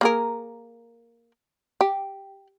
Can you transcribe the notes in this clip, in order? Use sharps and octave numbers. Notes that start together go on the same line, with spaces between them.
A#3 G#4 A#4
G4